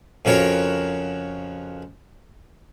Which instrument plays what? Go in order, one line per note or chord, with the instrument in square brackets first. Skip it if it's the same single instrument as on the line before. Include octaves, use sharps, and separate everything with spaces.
[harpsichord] F2 C#3 F#4 A#4 C#5